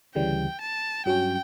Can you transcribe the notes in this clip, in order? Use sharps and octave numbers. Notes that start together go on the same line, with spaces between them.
D2 C#3 E3 G3 G5
A5
G2 F#3 C#4 G5